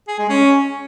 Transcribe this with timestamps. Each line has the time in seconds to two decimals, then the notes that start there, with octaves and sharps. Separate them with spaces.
0.08 G#4
0.19 G#3
0.29 C#4